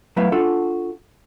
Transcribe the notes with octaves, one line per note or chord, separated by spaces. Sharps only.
F#3 A3 B3 E4 E5 F5
D4 F4 F#4 A4